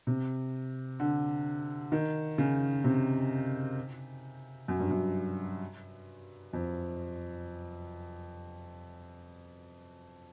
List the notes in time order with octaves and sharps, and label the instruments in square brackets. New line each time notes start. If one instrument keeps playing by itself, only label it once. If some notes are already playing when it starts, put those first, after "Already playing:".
[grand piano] C3
D3
D#3
C#3
C3
F#2
G2
F#2
F2